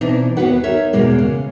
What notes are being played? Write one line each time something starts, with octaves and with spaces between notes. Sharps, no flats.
B2 E3 C4 D4 D#4
D#2 C3 B3 F#4 B4 F#5
D#4 A#4 C#5 E5
E2 B2 G#3 A#3 B3
C#3